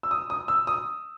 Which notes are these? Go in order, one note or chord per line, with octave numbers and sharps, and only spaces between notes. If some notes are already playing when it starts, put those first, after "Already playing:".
E6
D#6
D#6
E6
D#6